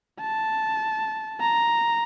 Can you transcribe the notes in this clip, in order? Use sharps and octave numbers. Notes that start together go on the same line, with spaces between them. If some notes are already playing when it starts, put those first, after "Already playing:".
A5
A#5